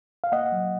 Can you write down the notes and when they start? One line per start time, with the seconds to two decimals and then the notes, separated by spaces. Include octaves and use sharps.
0.24 F5
0.32 A#3 D#5 F#5
0.52 F#3